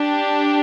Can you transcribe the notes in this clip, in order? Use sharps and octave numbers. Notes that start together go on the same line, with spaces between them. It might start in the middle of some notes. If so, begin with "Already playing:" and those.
Already playing: D4 G4